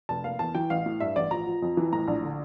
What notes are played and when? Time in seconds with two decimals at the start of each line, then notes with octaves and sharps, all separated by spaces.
0.09 F1 A5
0.24 A#3 F5
0.39 E2 A5
0.55 E3 G5
0.70 A1 F5
0.86 A2
1.00 G2 E5
1.16 A1 D5
1.31 F3 A#5
1.47 F3
1.62 F2
1.77 E3
1.92 A2 A#5
2.08 A#1
2.23 D3